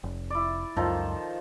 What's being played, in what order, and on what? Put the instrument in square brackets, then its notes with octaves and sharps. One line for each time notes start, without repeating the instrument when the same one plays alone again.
[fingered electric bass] F1
[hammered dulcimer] E4 D5
[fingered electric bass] C#2 F#2 [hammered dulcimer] D#3 F3 A4